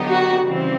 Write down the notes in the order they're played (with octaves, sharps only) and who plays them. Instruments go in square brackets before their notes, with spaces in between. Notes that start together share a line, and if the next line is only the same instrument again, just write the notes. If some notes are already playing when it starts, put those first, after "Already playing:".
Already playing: [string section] D3 F#3 B3 D#4 G4
[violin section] F#4
[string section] C#3 E3 G3 C4